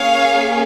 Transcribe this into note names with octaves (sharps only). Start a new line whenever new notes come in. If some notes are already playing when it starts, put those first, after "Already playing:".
Already playing: A#3 C#4 G#4 C#5 F5